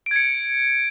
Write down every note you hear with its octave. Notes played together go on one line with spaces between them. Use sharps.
G#6 C#7 D7